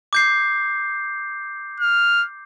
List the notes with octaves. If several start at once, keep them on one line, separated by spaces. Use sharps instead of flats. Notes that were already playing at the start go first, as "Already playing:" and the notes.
D6 G6 C7
F6